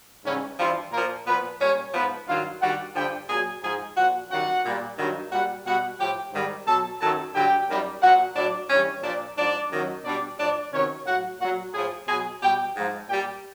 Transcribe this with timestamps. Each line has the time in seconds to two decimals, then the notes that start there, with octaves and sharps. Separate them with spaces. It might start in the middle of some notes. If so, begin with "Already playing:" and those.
0.25 G#2 C#3 E3 G3 C#4
0.58 G2 E3 F3 G3 F4
0.92 A#2 F3 A#3 A#4
1.26 A#2 F3 B3 B4
1.60 A#2 G3 C#4 C#5
1.94 G#2 F3 B3 B4
2.28 G2 D#3 F#3 F4 F5
2.61 G2 D#3 G3 F#4 F#5
2.95 G2 D3 F3 G4 G5
3.29 A#2 F#3 G#4 G#5
3.63 G#2 F3 G#4 G#5
3.96 A#2 F3 F#4 F#5
4.30 F#2 D#3 G3 F#4 F#5
4.65 A#2 G3
4.98 G2 D#3 F#3
5.32 A#2 G3 F#4 F#5
5.66 B2 G3 F#4 F#5
5.99 A2 F3 G4 G5
6.33 G#2 D#3 G3
6.67 B2 F#3 A4 A5
7.01 F#2 D#3 F#3 A4 A5
7.34 G2 D3 F#3 G4 G5
7.68 F#2 D#3 G3
8.02 A#2 F3 F#4 F#5
8.35 A2 F#3 D4 D5
8.69 G2 E3 G3 C#4 C#5
9.03 A#2 F3 D4 D5
9.37 G#2 F3 D4 D5
9.71 F#2 D#3 F#3
10.05 B2 G3 D4 D5
10.38 A2 F3 D4 D5
10.72 C3 D#3 F#3 C#4 C#5
11.06 A2 F#3 F#4 F#5
11.39 A#2 F#3 F#4 F#5
11.73 A2 F3 G#4 G#5
12.07 B2 F#3 G#4 G#5
12.41 B2 G3 G4 G5
12.76 G#2 F3
13.09 A#2 G3 G4 G5